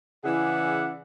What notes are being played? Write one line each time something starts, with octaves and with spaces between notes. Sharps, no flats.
C#3 E3 E4 G#4 D5 F#5